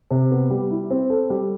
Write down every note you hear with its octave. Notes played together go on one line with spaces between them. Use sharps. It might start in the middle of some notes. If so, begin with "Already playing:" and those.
C3
B3
G3
E4
C4
A4
G3